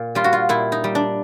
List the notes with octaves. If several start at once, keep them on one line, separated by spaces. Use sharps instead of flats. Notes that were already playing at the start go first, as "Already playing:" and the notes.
Already playing: A#2
G3 F4
F#4
F4
A#2 E4
D#4
G3
D4